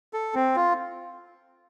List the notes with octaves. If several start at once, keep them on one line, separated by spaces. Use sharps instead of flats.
A4
C4
F4